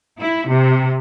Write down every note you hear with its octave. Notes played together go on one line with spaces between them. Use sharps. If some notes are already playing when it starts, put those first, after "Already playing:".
E4
C3